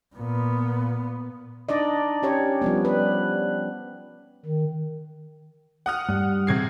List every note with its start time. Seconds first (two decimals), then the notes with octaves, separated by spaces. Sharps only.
0.15 A#2 B3
1.69 D4 D#4 D5 D#5
2.22 C#4 G4 C#5
2.62 F3 G3 B3
2.85 B4
4.46 D#3
5.86 F#5 D#6 F6
6.09 G2
6.47 C3 G#6 C7